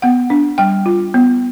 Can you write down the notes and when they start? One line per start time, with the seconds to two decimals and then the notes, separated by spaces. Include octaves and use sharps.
0.02 B3 F#5
0.30 D4
0.58 G3 G5
0.86 F4
1.14 B3